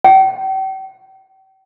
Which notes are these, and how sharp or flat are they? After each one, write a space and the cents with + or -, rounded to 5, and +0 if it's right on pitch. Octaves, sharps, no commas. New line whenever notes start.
G5 -40